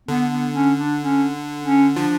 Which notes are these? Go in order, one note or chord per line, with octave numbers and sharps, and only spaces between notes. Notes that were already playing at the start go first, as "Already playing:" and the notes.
D3 B3
B3
C#4
D4
C#4
C#4
F3 D4